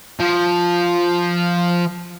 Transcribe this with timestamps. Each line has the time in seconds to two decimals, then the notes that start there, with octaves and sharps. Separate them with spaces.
0.20 F3